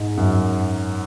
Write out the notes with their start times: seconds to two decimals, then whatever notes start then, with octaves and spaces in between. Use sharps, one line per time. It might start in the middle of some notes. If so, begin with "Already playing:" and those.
Already playing: G#2
0.17 F#2